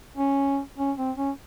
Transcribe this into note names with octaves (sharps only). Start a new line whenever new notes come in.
C#4
C#4
C4
C#4